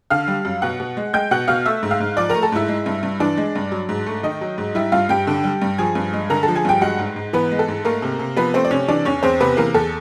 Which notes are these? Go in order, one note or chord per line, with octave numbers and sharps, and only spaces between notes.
D3 F5 F6
G3
F#2
B2 F#5 F#6
B2
G#3
G#3 G5 G6
B2 F#5 F#6
B2 F5 F6
A3 E5 E6
G#2
F5 F6
G#2
F3 D5 D6
A3 A#4 A#5
A4 A5
G#2 E4 E5
G#3
G2
G2
E3 D4 D5
G#3
G2
F#3
G#2
A3
D#3 D#4 D#5
F#3
G#2
G3 E4 E5
G2 F4 F5
G2 G4 G5
D3
G3
G2
F3 G#4 G#5
G2
G#3
D3 A#4 A#5
A4 A5
F3
G#4 G#5
G2 G4 G5
G#3 F#4 F#5
G#2
G#2
E3 B3 B4
G#3
A4
G#2
A3 A#3 A#4
C3
C3
F3 B3 B4
A3 C4 C5
D5
C3 C#4 C#5
E3 D4 D5
E2 C#4 C#5
E2 C4 C5
C3 B3 B4
E3 A#3 A#4
E2 A4